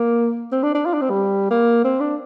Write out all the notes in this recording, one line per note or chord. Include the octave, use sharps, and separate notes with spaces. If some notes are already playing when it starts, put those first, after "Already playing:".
Already playing: A#3
C4
D4
D4
F4
D4
C4
G3
A#3
C4
D4